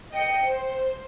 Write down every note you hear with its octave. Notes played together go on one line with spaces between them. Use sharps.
D#5 G5 C#7
C5